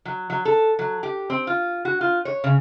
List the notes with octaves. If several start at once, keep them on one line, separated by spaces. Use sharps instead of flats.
F#3
F#3
A4
F#3
G4
C4
F4
F#4
F4
C#5
C#3